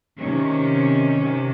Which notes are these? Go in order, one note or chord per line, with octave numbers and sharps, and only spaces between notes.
C3 D#3 C#4
C3 D#3